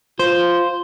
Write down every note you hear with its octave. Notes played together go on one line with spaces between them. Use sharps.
F4 C5